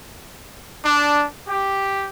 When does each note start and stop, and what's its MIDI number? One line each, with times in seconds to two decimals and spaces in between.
0.83 1.23 62
1.46 2.09 67